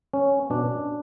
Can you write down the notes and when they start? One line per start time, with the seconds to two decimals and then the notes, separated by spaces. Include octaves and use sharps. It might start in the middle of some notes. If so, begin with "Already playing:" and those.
0.13 C#4
0.50 B2 D4